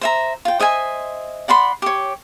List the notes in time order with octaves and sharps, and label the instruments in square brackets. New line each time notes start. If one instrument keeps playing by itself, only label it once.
[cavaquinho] C5 E5 A#5
F4 G5
C5 D#5 E5 G#5
D5 F#5 B5 C6
G4 C#5